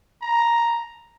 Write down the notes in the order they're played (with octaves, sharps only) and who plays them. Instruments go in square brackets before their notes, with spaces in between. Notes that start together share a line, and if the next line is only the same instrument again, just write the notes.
[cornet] A#5